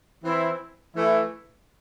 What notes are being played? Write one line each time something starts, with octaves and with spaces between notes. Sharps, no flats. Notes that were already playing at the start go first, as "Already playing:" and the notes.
E3 C4 E4
E3 A3 E4